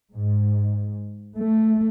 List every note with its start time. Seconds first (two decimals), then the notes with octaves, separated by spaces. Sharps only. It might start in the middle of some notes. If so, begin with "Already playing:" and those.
0.15 G#2
1.37 A3